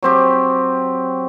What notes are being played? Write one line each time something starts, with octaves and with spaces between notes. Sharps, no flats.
F#3 C4 G4